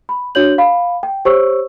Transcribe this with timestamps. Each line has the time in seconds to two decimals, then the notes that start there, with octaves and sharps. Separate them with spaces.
0.09 B5
0.35 D4 F#4 C#5 G6 F#7
0.58 F5 B5
1.03 G5
1.25 G4 C5 C#5 C#6 E6